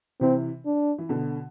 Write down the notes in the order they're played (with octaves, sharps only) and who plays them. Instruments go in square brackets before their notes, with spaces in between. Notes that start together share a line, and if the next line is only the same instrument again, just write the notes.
[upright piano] C3 E3 [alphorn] C4
[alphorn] D4
[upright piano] E3
B2 D3